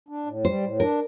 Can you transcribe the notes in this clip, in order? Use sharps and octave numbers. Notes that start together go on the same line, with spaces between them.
D4
A2
G3 C5
A2
D4 A#4